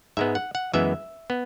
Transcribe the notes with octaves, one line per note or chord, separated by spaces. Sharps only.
G#2 G#3 B3 E5
F#5
F#5
F#2 E3 G#3 B3 E5
B3